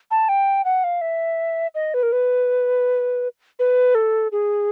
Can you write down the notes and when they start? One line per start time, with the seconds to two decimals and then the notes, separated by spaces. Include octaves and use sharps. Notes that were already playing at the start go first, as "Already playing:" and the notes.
0.11 A5
0.29 G5
0.65 F#5
0.84 F5
1.01 E5
1.75 D#5
1.94 B4
2.03 A#4
2.12 B4
3.59 B4
3.95 A4
4.32 G#4